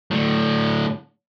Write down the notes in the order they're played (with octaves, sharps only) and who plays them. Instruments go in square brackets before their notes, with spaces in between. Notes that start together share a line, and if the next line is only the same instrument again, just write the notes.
[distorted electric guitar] A2 D3